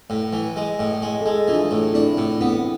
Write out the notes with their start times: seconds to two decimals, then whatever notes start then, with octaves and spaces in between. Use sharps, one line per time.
0.10 A2
0.33 E3
0.56 G#3
0.79 A2
1.02 G#3
1.21 G#3 A4
1.34 G#4
1.48 E3 D4 F4
1.71 A2
1.94 C4 D4 E4
2.17 A2
2.41 B3 C4 E4